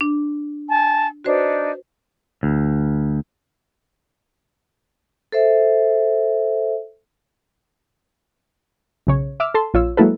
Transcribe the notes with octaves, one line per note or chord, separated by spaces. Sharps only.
D4
G#5 A5
D4 D#4 F#4 B4 C5
D2
A4 C5 E5
B1 C#3 C#5
E5 D6 E6 F6
A4 A5 C6
A#1 F4 C#5 E6
F#3 G#3 A#3 E4 A4 B4